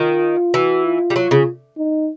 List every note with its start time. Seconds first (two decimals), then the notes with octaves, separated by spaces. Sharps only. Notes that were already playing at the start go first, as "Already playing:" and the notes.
Already playing: D#3 F4
0.54 E3 F#4
0.85 F4
1.10 G3
1.16 F#3
1.31 C#3
1.78 D#4